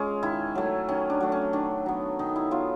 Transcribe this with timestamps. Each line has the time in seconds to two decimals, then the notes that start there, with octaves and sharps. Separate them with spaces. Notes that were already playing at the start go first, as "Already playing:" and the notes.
Already playing: G#3 C#4 F4
0.23 D#3 E4
0.55 F#3 A3
0.89 D#3 C#4
1.10 D4
1.21 F#3 A3
1.32 C#4
1.53 D#3 D4
1.86 F#3 B3
2.19 D#3 D#4
2.36 E4
2.51 F#3 B3 F4